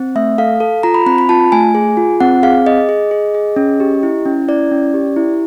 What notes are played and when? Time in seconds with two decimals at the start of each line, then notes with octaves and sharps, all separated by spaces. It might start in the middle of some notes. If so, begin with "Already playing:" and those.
Already playing: C4
0.15 A3 E5
0.38 A4 F5
0.60 A4
0.83 F4 A#5
0.94 B5
1.06 C4 B5
1.18 B5
1.29 F4 A5
1.52 A3 G#5
1.75 G#4
1.97 F4
2.20 C4 F#5
2.43 G#4 F5
2.66 G#4 D#5
2.89 G#4
3.11 G#4
3.35 G#4
3.56 C#4
3.80 G4
4.03 E4
4.26 C#4
4.48 E4 D5
4.71 C#4
4.94 G4
5.16 E4